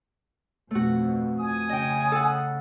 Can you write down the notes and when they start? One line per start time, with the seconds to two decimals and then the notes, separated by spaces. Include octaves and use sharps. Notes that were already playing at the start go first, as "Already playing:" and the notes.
0.71 F2 B2 A3 F#4
1.40 G#5 D#6
1.69 C#3 D#5 G5
2.12 A4 F#5